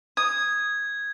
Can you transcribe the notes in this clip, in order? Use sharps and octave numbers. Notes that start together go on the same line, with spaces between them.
D#6 G#6